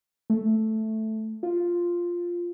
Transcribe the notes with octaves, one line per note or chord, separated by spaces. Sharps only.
A3
F4